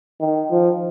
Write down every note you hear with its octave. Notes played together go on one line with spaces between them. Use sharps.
D#3
F3